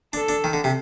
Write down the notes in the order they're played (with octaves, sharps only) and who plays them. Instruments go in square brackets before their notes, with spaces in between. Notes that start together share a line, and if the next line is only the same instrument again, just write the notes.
[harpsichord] D4 [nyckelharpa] A4
[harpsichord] D4
D#3
D3
C3